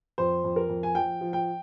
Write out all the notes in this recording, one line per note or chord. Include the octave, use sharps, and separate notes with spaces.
F2 C5
F2
A#4
F2
G#5
F3 G5
F3
G5